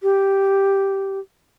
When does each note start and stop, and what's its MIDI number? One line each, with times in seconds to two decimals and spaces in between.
0.03 1.19 67